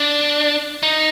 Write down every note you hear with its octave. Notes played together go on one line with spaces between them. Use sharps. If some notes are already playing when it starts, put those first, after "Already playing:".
Already playing: D4
D#4